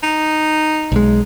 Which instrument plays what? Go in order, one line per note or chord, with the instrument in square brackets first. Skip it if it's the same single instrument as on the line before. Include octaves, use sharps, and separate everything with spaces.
[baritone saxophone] D#4
[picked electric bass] B1 G#3